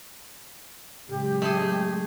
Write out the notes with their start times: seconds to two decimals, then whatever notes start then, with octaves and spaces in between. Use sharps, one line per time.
1.09 F#2 A2 C#3 G#3 G4
1.42 A3 G#4